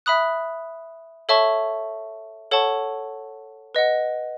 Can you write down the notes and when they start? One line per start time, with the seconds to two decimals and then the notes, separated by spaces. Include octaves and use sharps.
0.06 E5 B5 D#6 F#6
1.29 A4 C#5 E5 A5 C#6
2.51 A4 C#5 F#5 A5 C#6
3.75 B4 D#5 F#5